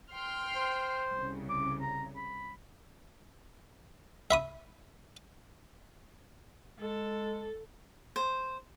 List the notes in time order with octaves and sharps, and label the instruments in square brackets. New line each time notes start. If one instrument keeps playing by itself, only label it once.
[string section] G5 C6 F6
[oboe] C5
[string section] C2 C#3
[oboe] D6
A#5
B5
[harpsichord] E5 B5 D#6
[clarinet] G#3 [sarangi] A4
[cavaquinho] C5